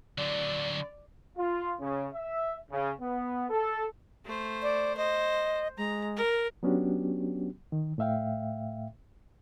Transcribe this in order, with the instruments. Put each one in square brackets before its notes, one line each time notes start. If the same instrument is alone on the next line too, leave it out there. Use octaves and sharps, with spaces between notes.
[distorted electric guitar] D3 F#3 [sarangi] D5
[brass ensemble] F4
C#3
E5
C#3
B3
A4
[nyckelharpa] A3 C5
[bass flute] D5
[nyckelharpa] C5 [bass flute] D#5
[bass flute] G#3 [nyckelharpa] A#5
[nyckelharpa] A#4
[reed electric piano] F#3 B3 C#4 D4 F#4 G4
D#3
A2 A3 E5 F5 G5